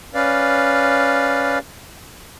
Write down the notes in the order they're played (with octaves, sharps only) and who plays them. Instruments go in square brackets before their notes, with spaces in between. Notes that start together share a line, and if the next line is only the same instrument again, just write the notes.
[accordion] C#4 B4 D5 F5